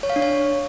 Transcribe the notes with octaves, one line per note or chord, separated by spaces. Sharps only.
C#5
F5
D4
C#5